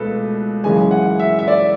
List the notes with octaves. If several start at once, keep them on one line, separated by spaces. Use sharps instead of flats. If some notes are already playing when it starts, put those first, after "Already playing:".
Already playing: C#2 B2 A3 A4 B4
F#2 C#3 E3 G#3 G#5
F#5
E5
E5
D5